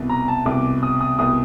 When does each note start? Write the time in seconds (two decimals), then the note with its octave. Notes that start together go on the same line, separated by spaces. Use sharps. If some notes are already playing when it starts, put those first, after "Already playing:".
Already playing: C2 B2
0.09 A#5
0.28 A5
0.46 C2 B2 D6
0.83 D#6
1.01 D#6
1.19 C2 B2 D#6